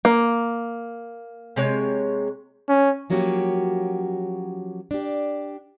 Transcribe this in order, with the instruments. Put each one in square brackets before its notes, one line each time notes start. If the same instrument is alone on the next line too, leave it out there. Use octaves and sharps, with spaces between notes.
[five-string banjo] A#3
[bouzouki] C3 G#3 C#5
[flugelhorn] C#4
[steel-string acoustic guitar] F3 F#3 A#3 C#4 F#4 G4
D4 G4